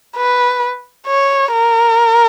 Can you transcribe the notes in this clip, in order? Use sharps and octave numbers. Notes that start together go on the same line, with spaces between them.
B4
C#5
A#4